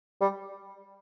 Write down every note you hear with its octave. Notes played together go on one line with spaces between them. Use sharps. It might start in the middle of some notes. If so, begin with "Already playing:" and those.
G3